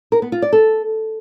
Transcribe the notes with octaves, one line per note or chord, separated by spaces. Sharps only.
A#4
B3
F4
D5
A4